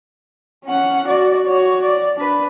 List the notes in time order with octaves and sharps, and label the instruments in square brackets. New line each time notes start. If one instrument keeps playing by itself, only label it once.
[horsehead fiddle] C#4 F#5
F#4 D5
F#4 C#5
D5
D4 B4